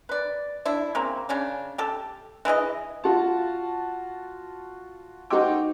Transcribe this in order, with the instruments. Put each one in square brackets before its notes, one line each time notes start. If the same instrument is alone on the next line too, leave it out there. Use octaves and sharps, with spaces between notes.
[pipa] B4 D5
D4 E4
C#3 A#3 C4
C#3 C#4 D4
G4 A4
E3 E4 G#4 D#5
[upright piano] F4 F#4 A5
D#4 F#4 C5 D#5 G5 D6